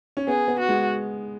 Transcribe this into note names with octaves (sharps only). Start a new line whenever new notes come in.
C#4
B3 G#4
B3
F#4
G#3